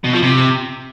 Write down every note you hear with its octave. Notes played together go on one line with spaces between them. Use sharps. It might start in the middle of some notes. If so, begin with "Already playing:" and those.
B2
F3
C3